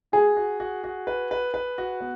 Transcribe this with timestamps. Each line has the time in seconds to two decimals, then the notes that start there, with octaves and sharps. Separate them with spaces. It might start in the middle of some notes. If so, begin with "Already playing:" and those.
0.12 F#4 G#4
0.36 F#4
0.60 F#4
0.84 F#4
1.07 B4
1.31 B4
1.54 B4
1.78 F#4
2.01 B3